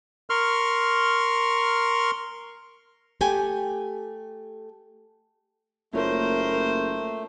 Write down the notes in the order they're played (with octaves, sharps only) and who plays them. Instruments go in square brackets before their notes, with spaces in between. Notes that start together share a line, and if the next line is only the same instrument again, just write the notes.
[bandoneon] A#4 C6 C#6 F6
[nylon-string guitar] A3 G4 G5 G#5
[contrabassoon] F#1 [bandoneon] A3 [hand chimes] A#3 F4 C#5 [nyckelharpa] A#4 C5